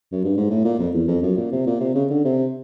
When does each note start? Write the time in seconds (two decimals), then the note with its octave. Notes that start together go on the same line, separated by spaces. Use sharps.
0.12 F#2
0.24 G2
0.37 G#2
0.50 A2
0.64 A#2
0.79 F2
0.94 E2
1.07 F2
1.22 F#2
1.37 A#2
1.52 C3
1.66 A#2
1.80 C3
1.95 C#3
2.10 D3
2.24 C3